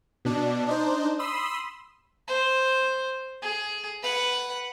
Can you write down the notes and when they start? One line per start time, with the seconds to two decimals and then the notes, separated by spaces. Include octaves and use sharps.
0.25 B2 D4
0.67 D4 D#4 C5
1.19 B5 C6 D#6 E6
2.28 C5
3.42 G#4
4.02 B4 F#5